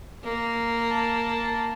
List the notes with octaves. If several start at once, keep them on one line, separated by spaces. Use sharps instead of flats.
A#3
A5